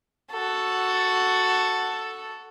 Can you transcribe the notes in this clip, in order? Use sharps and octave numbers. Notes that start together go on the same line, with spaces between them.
F#4 A4